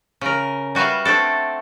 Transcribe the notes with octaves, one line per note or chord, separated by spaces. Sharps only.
C#3 A#4
G3 F#4 B4 E5 F5
A3 C4 D4 A4